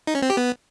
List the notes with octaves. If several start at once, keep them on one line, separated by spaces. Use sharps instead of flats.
D#4
C#4
C4
G4
B3